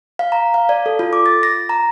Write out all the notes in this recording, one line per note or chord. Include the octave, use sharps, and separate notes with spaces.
F5
A#5
F5
D5
A4
F4
D6
A6
A#6
A#5